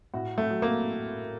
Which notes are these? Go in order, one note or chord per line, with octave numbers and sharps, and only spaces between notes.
A2 F#4
A3
F#3
A#3